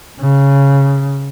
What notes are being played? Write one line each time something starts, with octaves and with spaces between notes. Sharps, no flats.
C#3